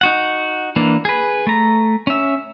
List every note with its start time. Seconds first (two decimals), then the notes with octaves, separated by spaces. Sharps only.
0.01 D#4 F#4 F#5
0.76 E3 A#3 D4
1.05 G#4 B4
1.47 A3 A#5
2.07 C#4 E5